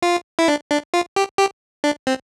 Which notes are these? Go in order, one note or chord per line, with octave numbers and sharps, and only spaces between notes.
F4
E4
D4
D4
F4
G4
G4
D4
C4